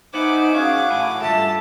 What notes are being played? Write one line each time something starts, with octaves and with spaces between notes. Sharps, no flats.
B3 D#4 C5 E5 F#5 G#5 D6
F#2 C#4 G#4 F5 F#5
A2 E4 G#5
D2 G2 F4 A4 E5 A5